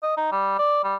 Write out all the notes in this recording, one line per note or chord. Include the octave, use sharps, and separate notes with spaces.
D#5
D#4
G3
D5
G3